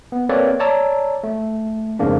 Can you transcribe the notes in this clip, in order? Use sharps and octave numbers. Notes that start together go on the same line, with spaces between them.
B3
A#3 C4 A4 B4 C#5 D5
C#5 D5 A5 A#5 E6
A3
F2 G#2 C#3 A#3 D4